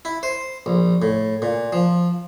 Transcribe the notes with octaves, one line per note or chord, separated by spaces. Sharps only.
E4
C5
A#1
A2
A#2
F3